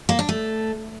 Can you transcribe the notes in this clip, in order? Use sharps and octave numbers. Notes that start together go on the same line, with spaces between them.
A#3
D4
A3